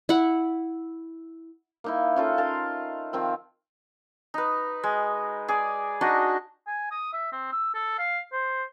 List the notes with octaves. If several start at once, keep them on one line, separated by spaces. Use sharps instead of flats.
E4 F#5
A#3 D#4 E4
C#4 F4 A4
A#4 F5 A5 C6
D#3 F3 C4
D#4 B4
G#3
G#4 D5
D4 D#4 F#4 D#5
G#5
D#6
E5
C4
E6
A4
F5
C5